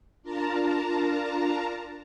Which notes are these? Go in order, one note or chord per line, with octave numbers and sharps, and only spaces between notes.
D4 F4 A#4 A5 A#5